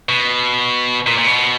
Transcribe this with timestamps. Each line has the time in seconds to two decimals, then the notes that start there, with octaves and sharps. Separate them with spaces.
0.09 B2
1.07 A#2
1.18 A#2
1.26 B2